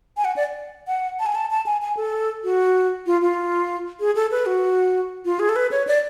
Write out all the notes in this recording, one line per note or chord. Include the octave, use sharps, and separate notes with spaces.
G#5
F#5
D5
F#5
A5
G#5
A5
A5
G#5
G#5
A4
F#4
F4
F4
G#4
A4
B4
F#4
F4
G#4
A4
B4
C#5
D5